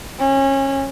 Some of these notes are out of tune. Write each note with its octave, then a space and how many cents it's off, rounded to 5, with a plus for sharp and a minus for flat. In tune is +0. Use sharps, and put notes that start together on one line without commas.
C#4 -25